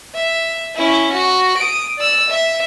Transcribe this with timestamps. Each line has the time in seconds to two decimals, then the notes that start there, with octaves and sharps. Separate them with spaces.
0.15 E5
0.76 C#4 E4
1.13 F#4
1.58 D#6 D7
1.98 D5 E6
2.30 E5